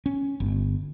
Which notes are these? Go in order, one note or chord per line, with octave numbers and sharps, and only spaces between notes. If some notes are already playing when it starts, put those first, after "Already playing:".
C#4
G1